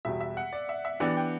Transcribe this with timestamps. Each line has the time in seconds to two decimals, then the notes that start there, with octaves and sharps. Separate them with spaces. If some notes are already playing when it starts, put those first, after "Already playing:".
0.05 E2 B2 G3 E5
0.21 E5
0.37 F#5
0.53 D5
0.69 E5
0.85 E5
1.00 E3 B3 D4 G4 D5 F#5
1.17 G5